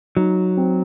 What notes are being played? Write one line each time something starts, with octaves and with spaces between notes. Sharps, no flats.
F#3 D#4
C4